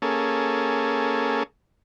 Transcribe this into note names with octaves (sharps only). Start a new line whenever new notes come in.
A#3 C#4 G#4 A4